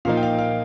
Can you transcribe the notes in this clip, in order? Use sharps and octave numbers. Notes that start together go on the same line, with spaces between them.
A#2 F3 A#3 D#4 F5
G5
F5
F5